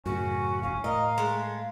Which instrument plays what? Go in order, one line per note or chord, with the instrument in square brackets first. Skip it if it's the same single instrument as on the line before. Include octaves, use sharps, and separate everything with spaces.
[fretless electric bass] F#2 A2 C#3 [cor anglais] C#4 [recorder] F#4
[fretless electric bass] E1 [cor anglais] C#4 [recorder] F5
[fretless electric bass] A2 [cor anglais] A#4 [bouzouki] D#5 [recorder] F5
[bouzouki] G#3 A3